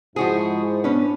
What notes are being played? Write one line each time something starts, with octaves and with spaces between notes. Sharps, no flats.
G#2 F3 E4 F#4 G#4 C5
B3 C#4 D4 B4